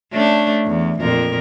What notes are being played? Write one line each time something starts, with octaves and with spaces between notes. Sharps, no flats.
A3 C#4 D4
E2
F2 A#2 A#4